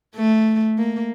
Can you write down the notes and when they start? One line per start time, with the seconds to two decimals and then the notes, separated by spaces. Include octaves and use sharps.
0.16 A3
0.78 A#3